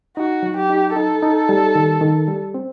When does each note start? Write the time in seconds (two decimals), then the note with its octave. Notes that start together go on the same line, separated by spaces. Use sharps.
0.17 D#4 F#4
0.43 F#3
0.56 G4
0.70 D#4
0.96 D#4 A4
1.22 D#4
1.49 G3
1.75 D#3
2.01 D#3
2.28 G3
2.54 C4